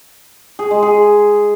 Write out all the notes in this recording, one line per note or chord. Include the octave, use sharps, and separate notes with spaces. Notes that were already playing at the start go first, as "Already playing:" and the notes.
G#4
G#3
G#4